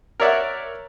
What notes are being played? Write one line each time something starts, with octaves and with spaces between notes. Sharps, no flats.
A#4 C#5 D5 E5 F#5